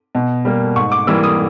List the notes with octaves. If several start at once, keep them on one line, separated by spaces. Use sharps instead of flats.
B2
G3 A#3
G#2 C#6
D6
E3 G3 A#3 E6
D#6